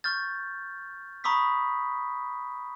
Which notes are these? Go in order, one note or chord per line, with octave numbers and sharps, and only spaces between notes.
C#6 F6 G6 A6
A#5 B5 C#6 D#6 E6 B6